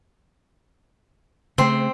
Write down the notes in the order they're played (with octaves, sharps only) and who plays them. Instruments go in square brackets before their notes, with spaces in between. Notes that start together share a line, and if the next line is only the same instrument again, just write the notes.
[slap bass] C#3 A3 [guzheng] C4 C6